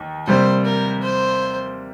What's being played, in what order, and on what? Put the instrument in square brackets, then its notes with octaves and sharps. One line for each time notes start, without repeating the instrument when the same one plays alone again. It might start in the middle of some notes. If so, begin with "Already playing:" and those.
Already playing: [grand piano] D#2
[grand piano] C3 G3 A#3 [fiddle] C5
[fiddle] A#4
C5